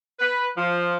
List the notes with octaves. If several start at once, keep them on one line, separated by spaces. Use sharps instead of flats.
B4
F3